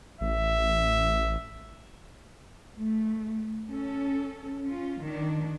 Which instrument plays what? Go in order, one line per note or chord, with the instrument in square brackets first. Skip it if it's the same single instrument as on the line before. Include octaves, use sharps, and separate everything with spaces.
[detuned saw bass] A1 [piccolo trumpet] E5
[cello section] A3
C#4 A4
C#4 F4
D#3 D4